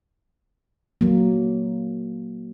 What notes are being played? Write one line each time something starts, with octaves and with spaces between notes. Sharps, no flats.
F#3 A#3